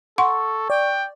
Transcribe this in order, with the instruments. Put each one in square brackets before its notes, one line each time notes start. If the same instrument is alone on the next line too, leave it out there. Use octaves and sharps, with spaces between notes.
[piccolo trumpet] A4 [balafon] F#5 C6 [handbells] C#6
[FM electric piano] D5 [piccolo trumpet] G5